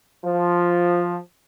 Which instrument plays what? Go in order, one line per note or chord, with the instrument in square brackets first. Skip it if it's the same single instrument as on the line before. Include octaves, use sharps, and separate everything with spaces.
[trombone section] F3